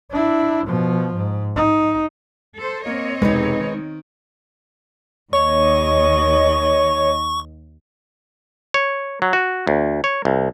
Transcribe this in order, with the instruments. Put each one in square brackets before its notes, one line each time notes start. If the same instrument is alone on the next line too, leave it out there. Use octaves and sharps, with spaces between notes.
[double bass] D4 E4
B2 F3
G#2
D#4
[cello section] A4 C5
[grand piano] A#3 [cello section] C4 C#5 D#5
[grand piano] E1 C3 [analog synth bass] G#3 [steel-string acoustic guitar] D#4 G#4 B4
[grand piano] D#3
[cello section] D#2 D#5 [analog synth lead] C#5 [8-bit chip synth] C#6
[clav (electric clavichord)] C#5
F#3
F#4
D2
C#5
C2